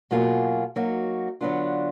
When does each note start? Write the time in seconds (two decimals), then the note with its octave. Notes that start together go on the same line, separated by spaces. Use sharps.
0.11 B2 F#3 A#3 F4 G#4
0.76 F#3 A#3 D#4 F#4
1.41 D3 F#3 B3 D4 F4